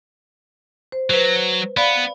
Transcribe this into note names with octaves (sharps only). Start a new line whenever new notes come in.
C5
F#3 B4 C5
B3 D5 F5 B5